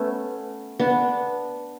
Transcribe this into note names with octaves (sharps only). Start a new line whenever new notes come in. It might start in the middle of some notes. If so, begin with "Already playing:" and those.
Already playing: A3 B3 C#4
B3 D4